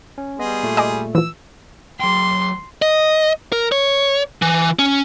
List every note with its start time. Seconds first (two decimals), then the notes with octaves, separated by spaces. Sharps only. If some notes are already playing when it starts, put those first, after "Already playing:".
0.18 C#4
0.39 G3 B3 G#4 D#5 C6
0.63 A#2 A3
0.77 D#5 G#5 D6
1.15 E3 F3 E6
2.00 F#3 G5 C6
2.82 D#5
3.52 A#4
3.72 C#5
4.42 E3
4.79 C#4